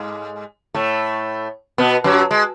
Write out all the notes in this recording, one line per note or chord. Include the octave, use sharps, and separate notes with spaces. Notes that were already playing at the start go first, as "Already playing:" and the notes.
Already playing: G#2 G#3
A2 A3
B2 B3
F#2 F#3
G#3